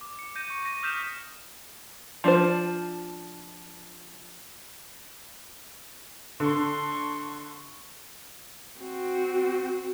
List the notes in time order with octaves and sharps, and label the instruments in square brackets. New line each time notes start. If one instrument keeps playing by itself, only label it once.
[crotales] D6
C#7
G6 A#6 D#7
C#6 C#7
A#6 D#7
D#6 F6 G6 B6 E7
[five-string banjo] F3 D4 F4 C5
[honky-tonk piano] D3 [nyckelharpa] C6 C#6
[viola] C4 F#4